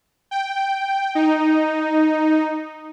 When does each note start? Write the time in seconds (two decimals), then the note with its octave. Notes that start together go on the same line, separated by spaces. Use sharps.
0.31 G5
1.15 D#4